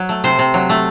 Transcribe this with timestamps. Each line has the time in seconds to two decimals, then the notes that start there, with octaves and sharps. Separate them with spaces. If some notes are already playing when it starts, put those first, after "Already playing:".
Already playing: F#3
0.09 A3
0.24 C3 C5
0.39 C3
0.54 F#3
0.69 A3